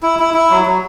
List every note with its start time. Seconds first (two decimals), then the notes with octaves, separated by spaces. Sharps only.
0.03 E4
0.19 E4
0.34 E4
0.50 F#3
0.66 F#3